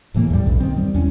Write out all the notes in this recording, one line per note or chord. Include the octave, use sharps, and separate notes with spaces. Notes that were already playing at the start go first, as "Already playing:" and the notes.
D1 A2 E3 A#3
E2 A2 G3
B1 G2
D#3 C4
G3
E2 C#4